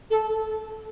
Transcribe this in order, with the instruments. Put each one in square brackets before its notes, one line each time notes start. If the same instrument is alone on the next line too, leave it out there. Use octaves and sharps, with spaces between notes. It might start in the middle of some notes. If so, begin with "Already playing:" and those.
[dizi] A4